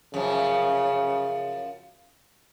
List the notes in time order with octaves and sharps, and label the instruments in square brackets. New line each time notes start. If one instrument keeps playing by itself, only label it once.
[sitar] F#2 F3 [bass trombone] C#3